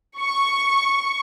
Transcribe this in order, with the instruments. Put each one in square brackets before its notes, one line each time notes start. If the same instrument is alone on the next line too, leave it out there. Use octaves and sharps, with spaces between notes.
[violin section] C#6